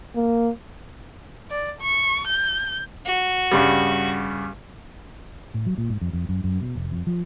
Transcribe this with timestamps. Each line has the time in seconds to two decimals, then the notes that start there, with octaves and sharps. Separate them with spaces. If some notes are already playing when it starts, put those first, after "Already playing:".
0.15 A#3
1.50 D5
1.81 C#6
2.27 G6
3.06 F#4
3.51 G2 C#3 G3
5.54 A2
5.66 F#3
5.78 A#2
5.90 G#2
6.01 F2
6.13 F2
6.29 F#2
6.44 F#2
6.61 B2
6.75 F1
6.92 F2
7.07 F3